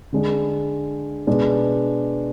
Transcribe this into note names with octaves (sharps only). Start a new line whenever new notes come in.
D3 G#3 D4
B2 G#3 D4